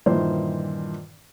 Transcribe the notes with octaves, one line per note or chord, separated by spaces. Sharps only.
G2 A#2 D#3 E3 C5